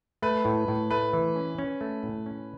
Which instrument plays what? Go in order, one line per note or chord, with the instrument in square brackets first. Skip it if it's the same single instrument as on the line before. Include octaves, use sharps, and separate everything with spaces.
[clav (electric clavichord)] A3 [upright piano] B4
[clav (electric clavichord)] A2
A2
[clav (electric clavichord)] A3 [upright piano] B4
[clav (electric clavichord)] E3
C#4
C#4
A3
A2
C#4